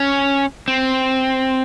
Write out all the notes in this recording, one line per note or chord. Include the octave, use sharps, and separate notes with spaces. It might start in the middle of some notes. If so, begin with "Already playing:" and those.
Already playing: C#4
C4